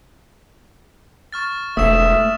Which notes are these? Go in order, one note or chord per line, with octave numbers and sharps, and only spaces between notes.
C#6 F6 A6
E1 A3 E5 D#6 E7